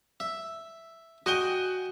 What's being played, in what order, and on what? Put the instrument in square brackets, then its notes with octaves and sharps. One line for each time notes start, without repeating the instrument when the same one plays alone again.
[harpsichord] E5
[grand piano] F#4 G7 [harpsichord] D#5 G5 G#5